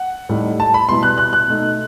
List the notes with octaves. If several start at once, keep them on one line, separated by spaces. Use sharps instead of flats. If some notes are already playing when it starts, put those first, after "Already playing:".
Already playing: F#5
A2 G3 D#4
A5
B5
B2 G3 B3 E4 C6
F#6
F#6
F#6
B2 A3 D#4